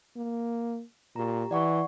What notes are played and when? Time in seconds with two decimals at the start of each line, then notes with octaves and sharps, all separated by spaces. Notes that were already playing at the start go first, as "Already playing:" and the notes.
0.17 A#3
1.16 A#2 G4 A#5
1.51 E3 D5 F#5 C#6